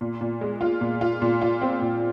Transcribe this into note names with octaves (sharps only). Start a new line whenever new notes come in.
A#2
A#2
G#3
F4
A#2
F4
A#2
F4
C4
A#2